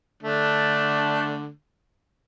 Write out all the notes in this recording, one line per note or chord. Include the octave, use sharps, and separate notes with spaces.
D3 A3 D4